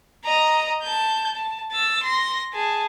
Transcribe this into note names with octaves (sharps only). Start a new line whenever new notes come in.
D#5 A#5
A5 G6
A5
E6 A6
C6 A#6
G#4 A5